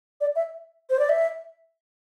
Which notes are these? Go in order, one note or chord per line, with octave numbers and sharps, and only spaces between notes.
D5
E5
C5
D5
E5